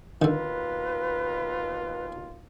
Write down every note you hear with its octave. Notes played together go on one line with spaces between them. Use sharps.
D#2 B2 D3 D#3 F4 B4